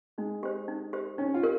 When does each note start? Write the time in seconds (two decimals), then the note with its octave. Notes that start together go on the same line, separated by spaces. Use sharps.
0.18 G#3 D#4
0.43 G4 C5
0.68 D#4
0.93 G4 C5
1.18 C#4 D#4
1.34 F4
1.43 G4 A#4